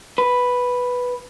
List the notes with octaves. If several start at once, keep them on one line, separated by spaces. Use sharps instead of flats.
B4